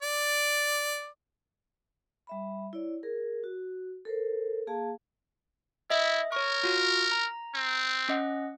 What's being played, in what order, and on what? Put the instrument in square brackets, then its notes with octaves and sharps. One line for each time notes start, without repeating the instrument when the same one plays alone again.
[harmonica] D5
[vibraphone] G3 E5 B5
E4 C#5 D5
G#4 A#4
F#4
A4 A#4 C5
A#3 G#4 F5 A5
[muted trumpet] E4 [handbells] D#5 E5
[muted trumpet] A#4 [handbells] C#5 C#6
[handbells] F4 F#4
A#5
[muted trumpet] C4
[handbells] C#4 D#5 F#5